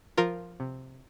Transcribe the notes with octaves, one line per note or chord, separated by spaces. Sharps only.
F3 F4 A#4
C3